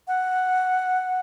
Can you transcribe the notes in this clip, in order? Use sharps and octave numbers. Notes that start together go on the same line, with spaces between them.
F#5